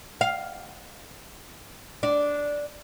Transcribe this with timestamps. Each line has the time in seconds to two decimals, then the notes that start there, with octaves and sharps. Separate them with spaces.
0.21 F5
2.03 D4